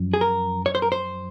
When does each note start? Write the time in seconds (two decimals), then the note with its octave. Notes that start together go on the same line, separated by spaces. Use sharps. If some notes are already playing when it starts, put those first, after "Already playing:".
Already playing: F#2 F3
0.14 G#4
0.21 A#4
0.66 C#5
0.75 C5
0.82 A#4
0.92 C5